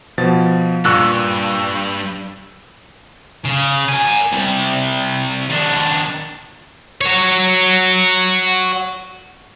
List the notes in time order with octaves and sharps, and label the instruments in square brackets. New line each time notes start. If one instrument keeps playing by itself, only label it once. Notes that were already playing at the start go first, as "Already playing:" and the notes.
[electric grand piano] B2 F3 A6
[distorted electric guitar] G2 [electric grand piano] A#2 [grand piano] C#6 E6 F#6
[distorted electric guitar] C#3
A#4 G#5
C3 G3
D#3 D4
F#4 C#5